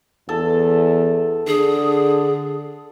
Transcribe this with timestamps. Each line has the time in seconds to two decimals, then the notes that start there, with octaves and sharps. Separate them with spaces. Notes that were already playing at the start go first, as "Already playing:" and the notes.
0.29 E2 A4
1.47 D3 G#4